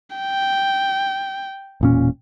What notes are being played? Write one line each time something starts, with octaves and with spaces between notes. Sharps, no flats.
G5
E1 A#2 C#4